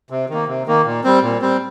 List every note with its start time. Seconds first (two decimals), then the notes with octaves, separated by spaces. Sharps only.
0.10 C3
0.29 D#3 A#3
0.48 C3
0.67 D#3 A#3
0.86 A#2
1.04 G3 C4
1.23 A#2
1.42 G3 C4